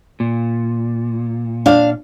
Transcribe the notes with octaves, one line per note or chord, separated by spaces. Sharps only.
A#2
D4 F5